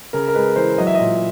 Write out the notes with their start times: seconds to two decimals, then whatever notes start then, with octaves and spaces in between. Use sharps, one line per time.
0.13 C#3 A#4
0.28 A#4
0.35 G#3 B4
0.56 E3 C5
0.78 F#3 D#5
0.87 E5
0.95 A#2 D#5